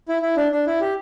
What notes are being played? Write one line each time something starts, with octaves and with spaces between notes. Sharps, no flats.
E4
E4
D4
D4
E4
G4